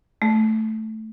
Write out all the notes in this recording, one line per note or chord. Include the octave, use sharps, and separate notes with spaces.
A3